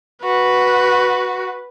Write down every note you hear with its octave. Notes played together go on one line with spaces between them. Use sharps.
F#4 B4